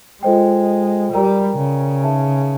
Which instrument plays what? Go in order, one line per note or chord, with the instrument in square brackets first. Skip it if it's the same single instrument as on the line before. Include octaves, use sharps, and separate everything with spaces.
[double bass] G#3 [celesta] F4 A4 C5 D#5 G5
[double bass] G3 [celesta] A#4 D5 G5 A#5
[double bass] C#3
[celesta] D#4 G#4 B4 E5 A5